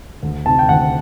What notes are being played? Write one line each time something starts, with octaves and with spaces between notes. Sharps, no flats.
D2
C3 D#3 A5
G5
D2 F#5